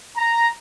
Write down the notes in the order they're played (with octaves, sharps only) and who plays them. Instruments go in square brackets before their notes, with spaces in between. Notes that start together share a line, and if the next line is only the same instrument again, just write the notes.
[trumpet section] A#5